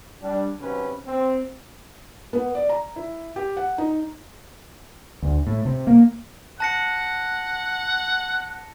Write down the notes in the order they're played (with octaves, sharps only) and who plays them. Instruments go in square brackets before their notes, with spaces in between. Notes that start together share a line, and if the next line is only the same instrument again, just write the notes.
[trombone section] G3 D4
B1 C3 C#4 B4
C4
[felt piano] B3
D5
A#5
E4
G4
F#5
D#4
[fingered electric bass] D2
A2
C3
A#3
[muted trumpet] F#5 [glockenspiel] A5 A#6 C#7